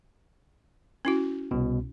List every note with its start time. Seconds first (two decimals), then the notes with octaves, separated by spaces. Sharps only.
1.05 C#4 E4 F#4
1.51 C2 B2